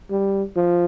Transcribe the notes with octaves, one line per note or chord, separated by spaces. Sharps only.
G3
F3